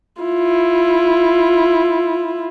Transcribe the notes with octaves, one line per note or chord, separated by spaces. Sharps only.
E4 F4